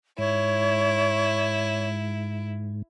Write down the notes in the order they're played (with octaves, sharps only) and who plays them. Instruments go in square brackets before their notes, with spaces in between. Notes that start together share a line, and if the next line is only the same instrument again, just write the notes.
[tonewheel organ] G#2 [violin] E4 [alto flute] C#5